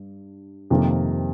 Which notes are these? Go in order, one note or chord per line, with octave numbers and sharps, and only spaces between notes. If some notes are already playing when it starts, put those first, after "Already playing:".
Already playing: G2
F2 C3 D#3 G3 A#3